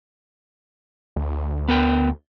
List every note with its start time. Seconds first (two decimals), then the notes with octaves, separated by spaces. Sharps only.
1.16 D2
1.68 B3 A#4 G5